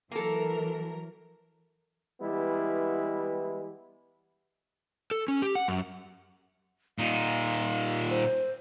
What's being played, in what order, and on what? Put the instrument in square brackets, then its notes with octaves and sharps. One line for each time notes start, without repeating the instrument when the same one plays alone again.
[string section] E3 F#3 A#4 [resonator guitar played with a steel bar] A#3 A4
[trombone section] E3 G3 G#3 B3 E4
[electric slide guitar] A4
C#4
G4
F#5
F#2
[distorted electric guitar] A#2 D#4 [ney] F5
[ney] C5